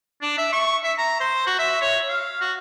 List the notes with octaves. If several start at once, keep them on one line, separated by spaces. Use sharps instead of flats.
D4
E5
C#6
E5
A#5
C5
F#4
E5
C#5
F5
F#4